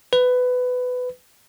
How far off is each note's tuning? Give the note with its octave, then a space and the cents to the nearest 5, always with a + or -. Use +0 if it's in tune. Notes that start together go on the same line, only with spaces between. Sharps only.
B4 +15